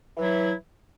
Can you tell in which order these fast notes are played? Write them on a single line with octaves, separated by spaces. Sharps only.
E3 F#3 E4